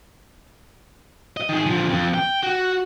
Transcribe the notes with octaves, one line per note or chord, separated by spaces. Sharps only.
D#5
D#3 G#4
D3 F3
F2
G5
F#4